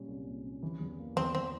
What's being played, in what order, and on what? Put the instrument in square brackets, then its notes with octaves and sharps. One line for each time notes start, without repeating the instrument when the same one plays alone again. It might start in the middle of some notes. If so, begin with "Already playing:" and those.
Already playing: [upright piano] A#2 G3 C#4
C2
A#2
C#4
E3
E2
A#3
[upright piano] E2 [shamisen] C4
[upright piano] E3 [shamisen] C4